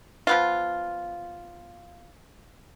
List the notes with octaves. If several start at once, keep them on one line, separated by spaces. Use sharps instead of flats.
F3 B3 F4